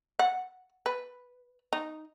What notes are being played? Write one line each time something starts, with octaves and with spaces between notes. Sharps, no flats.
F#5
B4
D#4